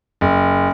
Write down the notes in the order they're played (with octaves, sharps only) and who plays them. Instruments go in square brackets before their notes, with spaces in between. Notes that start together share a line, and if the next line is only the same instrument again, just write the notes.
[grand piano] F#1